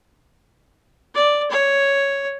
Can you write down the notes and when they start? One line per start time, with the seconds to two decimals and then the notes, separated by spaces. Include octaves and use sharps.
1.15 D5
1.51 C#5